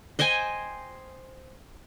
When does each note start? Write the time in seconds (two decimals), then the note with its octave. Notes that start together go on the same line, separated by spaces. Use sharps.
0.19 C5 D#5 G5 G#5